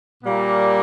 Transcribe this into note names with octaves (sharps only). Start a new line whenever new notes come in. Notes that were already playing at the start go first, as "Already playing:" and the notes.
A#2 G3 A#3